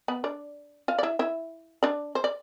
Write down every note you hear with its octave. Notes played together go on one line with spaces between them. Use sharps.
B3 B4
D4 D5
F4 F5
D5
E4 E5
E4 E5
D4 D5
C5
D5